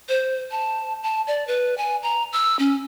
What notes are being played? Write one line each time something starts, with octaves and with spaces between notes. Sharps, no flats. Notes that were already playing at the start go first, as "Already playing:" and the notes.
C5
A5
A5
D5
B4
G#5
A#5
E6
C#4